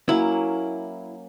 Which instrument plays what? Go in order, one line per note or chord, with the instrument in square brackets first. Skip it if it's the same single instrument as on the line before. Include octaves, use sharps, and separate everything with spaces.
[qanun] F#3 A#3 C#4 [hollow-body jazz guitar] E4